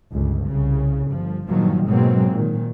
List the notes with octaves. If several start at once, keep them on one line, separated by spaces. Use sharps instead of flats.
G1 C#2
C2 C#3
G1 F3
G2 A#2 D#3 F3 F#3
G#2 B2 F#3 G#3 A#3 C4
A#2 D#3